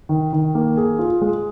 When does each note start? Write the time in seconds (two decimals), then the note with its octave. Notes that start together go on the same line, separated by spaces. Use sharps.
0.09 D#3
0.33 D#3
0.55 A#3
0.77 G#4
0.99 F4
1.22 G#3